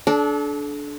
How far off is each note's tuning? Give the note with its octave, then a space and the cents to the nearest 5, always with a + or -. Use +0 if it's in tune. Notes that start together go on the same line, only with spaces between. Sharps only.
D4 -10 A4 -35